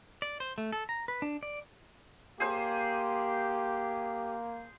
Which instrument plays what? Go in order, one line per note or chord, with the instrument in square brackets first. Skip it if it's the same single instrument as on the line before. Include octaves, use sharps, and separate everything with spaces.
[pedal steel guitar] D5
C5
A3
A4
A#5
B4
D4
D5
[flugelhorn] A#3 [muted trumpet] G4 [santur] G#4 C5